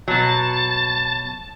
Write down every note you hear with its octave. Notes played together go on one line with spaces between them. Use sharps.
B2 F#3 A5